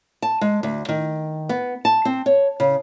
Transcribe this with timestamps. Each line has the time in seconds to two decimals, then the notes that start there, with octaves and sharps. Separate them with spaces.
0.22 A5
0.41 G#3
0.63 D2
0.89 D#3
1.49 B3
1.85 A5
2.05 C4
2.26 C#5
2.60 C#3